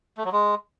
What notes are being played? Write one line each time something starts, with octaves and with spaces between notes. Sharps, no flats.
A3
F#3
G#3